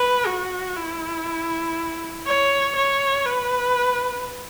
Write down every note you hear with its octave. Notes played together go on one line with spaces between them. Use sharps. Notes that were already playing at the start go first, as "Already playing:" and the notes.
Already playing: B4
F#4
E4
C#5
C#5
B4